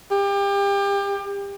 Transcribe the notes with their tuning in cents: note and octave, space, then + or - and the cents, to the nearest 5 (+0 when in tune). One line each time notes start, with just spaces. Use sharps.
G4 +30